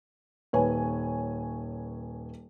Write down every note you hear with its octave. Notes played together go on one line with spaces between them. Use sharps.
D#1 B4 C#5 G#5